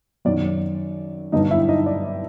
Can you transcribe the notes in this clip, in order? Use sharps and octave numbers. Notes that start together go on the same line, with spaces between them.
F#2 D#3 F#3 D5
G2 D3 F#3 D#4 D#5
E4 E5
D#4 D#5
D5